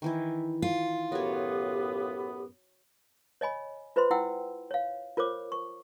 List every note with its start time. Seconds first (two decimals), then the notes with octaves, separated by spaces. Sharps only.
0.02 D#3 E3 E4
0.62 F4
1.12 F#2 A2 B3 F#4 G4 C#5
3.41 C#5 D#5 G#5 B5
3.96 F4 B4 C5 E5 B5 C6
4.10 E4 F4 F#5 G5 E6
4.71 C#5 F5
5.17 F4 A#4 C5 C#5 D6
5.52 C#6